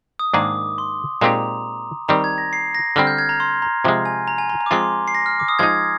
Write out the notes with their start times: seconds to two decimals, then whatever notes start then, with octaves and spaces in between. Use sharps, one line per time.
0.19 D#6
0.34 G#2 D#3 A#3 D4 G#4 D6
0.78 C6
1.21 A#2 G#3 C4 D#4 G4 A#5
2.08 D#3 G3 C4 A#5
2.24 G#6
2.38 A#6
2.53 C7
2.75 A#6
2.96 D3 G3 C4 F6
3.07 G6
3.18 G#6
3.29 A#5
3.40 C6
3.62 A#5
3.85 C3 F3 G#3
4.05 G#5
4.28 A#5
4.38 G#5
4.50 A#5
4.60 A#5
4.66 D6
4.71 F3 G#3 C4 F4 C6
5.08 C7
5.15 A#6
5.26 F6
5.40 D6
5.48 D#6
5.59 F3 G#3 D#4 G#6